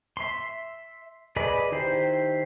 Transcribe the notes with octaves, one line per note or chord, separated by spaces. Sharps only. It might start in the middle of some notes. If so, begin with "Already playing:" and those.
E5 C6
G#4 B4 D5 D#5 B5
D#3 E4 G4 C5